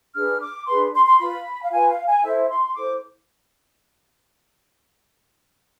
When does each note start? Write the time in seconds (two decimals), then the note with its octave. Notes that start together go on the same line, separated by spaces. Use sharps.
0.14 D4 G#4 B4 F6
0.41 D6
0.67 D4 G#4 B4 C6
0.94 C6
1.06 C6
1.19 F4 B4 B5
1.64 F5
1.71 F4 B4 G#5
1.89 F5
2.07 G#5
2.23 E4 A4 C5 E5
2.49 C6
2.76 E4 A4 C5 D6